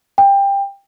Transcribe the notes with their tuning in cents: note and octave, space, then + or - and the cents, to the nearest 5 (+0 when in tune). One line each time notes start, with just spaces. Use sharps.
G5 +20